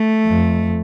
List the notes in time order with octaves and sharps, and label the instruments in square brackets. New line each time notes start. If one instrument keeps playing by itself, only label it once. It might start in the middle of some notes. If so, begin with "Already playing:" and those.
Already playing: [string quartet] A3
[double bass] F2